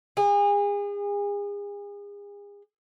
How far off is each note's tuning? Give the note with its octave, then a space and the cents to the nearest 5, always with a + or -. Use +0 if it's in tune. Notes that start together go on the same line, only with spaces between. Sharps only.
G#4 -35